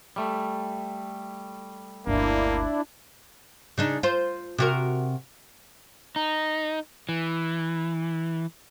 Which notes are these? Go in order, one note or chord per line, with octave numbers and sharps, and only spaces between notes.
G3 A3
G1 D2 A#3 D4 E4
C#3 D4 D#4
F4 C5
C3 F#4 A#4
D#4
E3